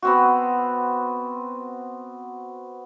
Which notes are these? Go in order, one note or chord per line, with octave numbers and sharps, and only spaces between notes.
B3 C4 F#4